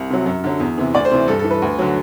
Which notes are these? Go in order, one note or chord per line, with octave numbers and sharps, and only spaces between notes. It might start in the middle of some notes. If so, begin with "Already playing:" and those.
Already playing: C2
C3 F#3
F#2
D3 F#3
E2
C3 E3
D2 D5
C5
C3 E3
G2 A4
A4
E3
B4
D2
D3 F#3